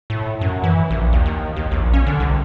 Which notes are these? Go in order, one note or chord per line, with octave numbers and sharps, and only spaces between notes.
A2
F#2
E3
A#1
D#2
D#2
D#2
A#1
C#4
D3
C2